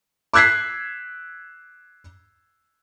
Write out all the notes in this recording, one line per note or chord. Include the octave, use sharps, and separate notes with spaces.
D6 E6 F#6 G#6 B6 C7